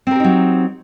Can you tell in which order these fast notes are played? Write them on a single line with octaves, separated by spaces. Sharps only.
C4 A#4 G4 D#4 F#3